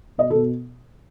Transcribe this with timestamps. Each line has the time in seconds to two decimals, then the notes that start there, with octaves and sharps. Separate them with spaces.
0.18 B2 D#5
0.30 A4
0.35 B2